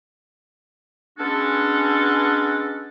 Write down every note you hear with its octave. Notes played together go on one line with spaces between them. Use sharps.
G#3 B3 C#4 D4 F#4 A4